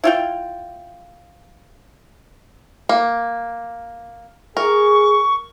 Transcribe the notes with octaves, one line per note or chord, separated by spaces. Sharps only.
E4 F4 G5
A#3
G#4 A#4 C#6